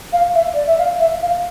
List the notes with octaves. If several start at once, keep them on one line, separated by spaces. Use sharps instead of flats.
F5
E5
D5
E5
F5
E5
F5